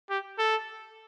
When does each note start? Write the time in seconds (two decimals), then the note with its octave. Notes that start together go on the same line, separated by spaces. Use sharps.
0.10 G4
0.39 A4